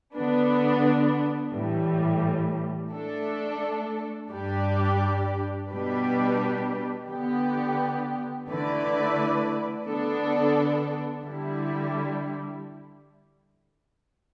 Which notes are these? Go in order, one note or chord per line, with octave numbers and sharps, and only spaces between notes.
D3 B3 D4 B4
A2 E3 G3
A3 D4 A4
G2 G3 D4 G4 D5
B2 G3 D4 G4 B4
D3 B3 G4
D3 A3 E4 B4 D5
D3 B3 D4 A4
D3 G3 E4